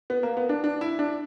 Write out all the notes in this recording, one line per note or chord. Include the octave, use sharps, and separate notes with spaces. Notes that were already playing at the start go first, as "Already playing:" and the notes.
B3
A#3
B3
D4
D4
E4
D4